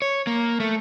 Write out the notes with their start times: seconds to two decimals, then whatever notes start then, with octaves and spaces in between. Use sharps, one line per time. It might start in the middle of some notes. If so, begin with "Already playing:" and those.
0.02 C#5
0.27 A#3
0.60 A3